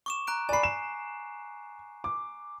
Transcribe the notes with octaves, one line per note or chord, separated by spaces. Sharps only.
C#6 D6 E7
A#5 F#6 D7
D5 G#5 B5 C7
E7
D6